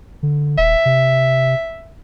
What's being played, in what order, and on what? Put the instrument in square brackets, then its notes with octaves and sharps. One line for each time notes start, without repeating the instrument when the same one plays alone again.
[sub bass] D3
[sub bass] D#1 [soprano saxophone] E5
[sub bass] C3